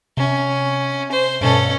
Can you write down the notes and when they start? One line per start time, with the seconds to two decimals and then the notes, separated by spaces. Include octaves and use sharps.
0.17 C3 C#4
1.11 C5
1.41 G2 B2 C#4 A4